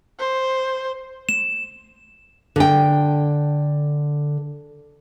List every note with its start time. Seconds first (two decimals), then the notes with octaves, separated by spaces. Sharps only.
0.19 C5
1.29 E7
2.56 D3 G5